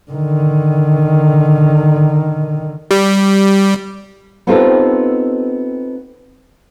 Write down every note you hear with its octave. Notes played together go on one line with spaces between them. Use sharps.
D3 D#3
G3
B3 C4 D#4 F4 G4 A4